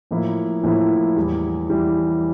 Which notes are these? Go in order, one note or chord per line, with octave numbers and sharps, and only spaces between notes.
A2 F3 A#3 E4
A2 F3 A#3 E4
E2 E3 G3
E2 E3 G3